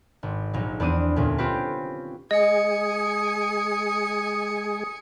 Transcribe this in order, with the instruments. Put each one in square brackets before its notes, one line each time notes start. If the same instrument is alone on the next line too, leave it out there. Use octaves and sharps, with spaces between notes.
[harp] G#1
A#1 F#3 D#4
E2 B3 C4 D4 D#6 D#7
D2 A#2 C#4
C4 C#4 F4 G4 B4
[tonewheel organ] G#3 G#4 [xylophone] D#5 [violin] G#5 C#7 [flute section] D#6